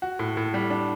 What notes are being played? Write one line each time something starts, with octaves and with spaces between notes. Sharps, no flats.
F#4
A2
A2
G3
D4